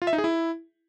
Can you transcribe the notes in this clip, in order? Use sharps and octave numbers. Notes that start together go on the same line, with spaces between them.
F4
E5
D#4
G#4
E4